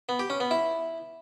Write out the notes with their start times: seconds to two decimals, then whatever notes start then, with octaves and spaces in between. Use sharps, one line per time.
0.09 B3
0.19 G4
0.30 C#4
0.40 B3
0.51 E4